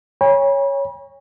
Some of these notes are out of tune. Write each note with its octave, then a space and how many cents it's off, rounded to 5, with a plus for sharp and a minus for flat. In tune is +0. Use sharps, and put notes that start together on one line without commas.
C#5 +0 G#5 -45 B5 -40